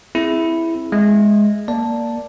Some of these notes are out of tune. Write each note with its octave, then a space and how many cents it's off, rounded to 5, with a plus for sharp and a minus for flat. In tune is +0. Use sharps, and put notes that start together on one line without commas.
C4 -5 E4 +0 G#4 +0
G#3 +0 E5 +0
A#3 +0 D5 +0 A5 +0